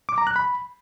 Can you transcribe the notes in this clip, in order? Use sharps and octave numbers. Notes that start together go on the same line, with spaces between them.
D6
A#5
F#6
B5